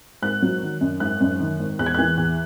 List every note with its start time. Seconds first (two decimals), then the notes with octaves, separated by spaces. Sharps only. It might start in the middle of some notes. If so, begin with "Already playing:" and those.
0.22 G#1 F#6
0.42 F#3
0.62 D#3
0.81 F#2
1.00 G#1 F#6
1.21 F#2
1.40 D#3
1.59 G#1
1.79 E2 F#6
1.86 G#6
1.94 E3 F#6
2.17 E2